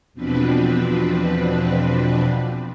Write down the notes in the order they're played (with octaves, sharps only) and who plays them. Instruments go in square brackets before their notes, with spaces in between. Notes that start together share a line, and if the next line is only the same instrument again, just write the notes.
[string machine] E2 B2 F3 C4 D4 B4